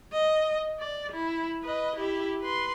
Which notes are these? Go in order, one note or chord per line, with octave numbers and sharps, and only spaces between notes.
D#5
D5
E4
B4 D#5
E4 G4
B4 C6